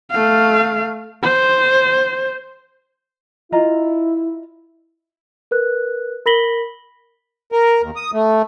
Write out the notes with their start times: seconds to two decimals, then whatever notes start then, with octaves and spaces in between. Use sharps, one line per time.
0.11 A3 F5
1.23 C5
3.52 E4 F4 D#5 A#5
5.51 A#4 B4 F#6
6.26 A#4 B5 A#6 B6 F#7 G7
7.52 A#4
7.82 D#2
7.96 D#6
8.13 A3